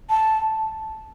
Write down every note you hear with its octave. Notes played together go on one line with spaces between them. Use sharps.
A5